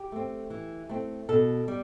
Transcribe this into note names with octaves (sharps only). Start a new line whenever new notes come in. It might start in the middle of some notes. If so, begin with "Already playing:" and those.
Already playing: G4
A3 C4
E3
A3 C4
B2 A4
G3